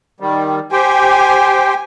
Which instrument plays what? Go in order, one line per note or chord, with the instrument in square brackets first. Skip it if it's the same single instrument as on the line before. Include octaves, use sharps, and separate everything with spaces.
[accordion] D#3 G3
[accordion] G4 C5 G5 [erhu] G#5